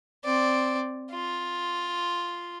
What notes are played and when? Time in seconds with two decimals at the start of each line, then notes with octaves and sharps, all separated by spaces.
0.24 C4 D5
1.11 F4